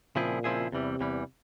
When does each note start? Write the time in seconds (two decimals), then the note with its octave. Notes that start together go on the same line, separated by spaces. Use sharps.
0.16 A#2 C#3 F3 C4 E4 G#4
0.44 C#3 F3 C4 E4 G#4
0.72 E2 C3 E3 G3
1.01 E2 E3 G3